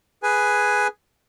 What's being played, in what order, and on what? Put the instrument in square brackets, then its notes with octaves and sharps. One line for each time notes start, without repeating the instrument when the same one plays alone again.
[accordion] G#4 B4 G#5